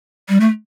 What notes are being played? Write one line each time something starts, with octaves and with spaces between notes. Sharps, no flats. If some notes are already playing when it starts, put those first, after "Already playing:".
G3
A3